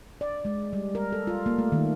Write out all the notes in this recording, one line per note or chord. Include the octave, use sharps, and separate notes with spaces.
D5
G#3
G3
A#4
A4
F4
A#3
A3
D#3